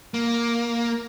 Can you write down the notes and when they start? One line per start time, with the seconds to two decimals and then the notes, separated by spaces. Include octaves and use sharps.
0.14 A#3